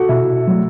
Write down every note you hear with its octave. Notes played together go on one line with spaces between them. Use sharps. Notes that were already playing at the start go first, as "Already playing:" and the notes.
Already playing: F#4 A4
B2 E4
F#3 A3